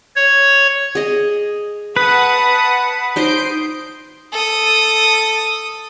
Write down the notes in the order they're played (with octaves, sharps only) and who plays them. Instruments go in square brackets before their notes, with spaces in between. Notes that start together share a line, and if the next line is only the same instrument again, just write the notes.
[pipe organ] C#5
[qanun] G#4 D#5
[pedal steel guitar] B4 [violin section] F#5 A5 D#6
[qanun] D#4 C5 D#5 [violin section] G6 C7 D7
[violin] A4 D#6